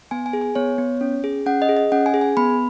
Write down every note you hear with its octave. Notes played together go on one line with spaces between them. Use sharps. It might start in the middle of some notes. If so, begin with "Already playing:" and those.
B3 G#5
G#5
G#4
G#5
B3 C#5
B3
C#4
G#4
C#4 F#5
D#5
G#4
D#5
C#4 F#5
G#5
G#4
G#5
B3 B5